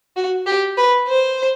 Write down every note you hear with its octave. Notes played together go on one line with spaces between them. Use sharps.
F#4
G4
B4
C5